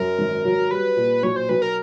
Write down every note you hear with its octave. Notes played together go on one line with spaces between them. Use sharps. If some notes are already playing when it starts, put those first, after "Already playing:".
Already playing: F#2 A#4
G#1
F#3
G3 B4
A#2
B1 C#5
C5
B1 B4
A#4